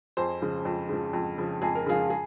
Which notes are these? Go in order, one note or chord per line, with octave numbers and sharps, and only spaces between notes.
F2 G#4 C5
C#3 F3
F2
C#3 F3
F2
C#3 F3
F2 G#4
A#4
C#3 F3 F4 G#4
G#4